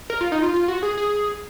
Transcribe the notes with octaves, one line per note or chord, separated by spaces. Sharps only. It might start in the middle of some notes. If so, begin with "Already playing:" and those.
A#4
F4
D#4
F4
F4
F#4
G#4
G#4